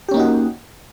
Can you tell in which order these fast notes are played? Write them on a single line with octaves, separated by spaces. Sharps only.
G4 C#4 A#3 D#4 F#4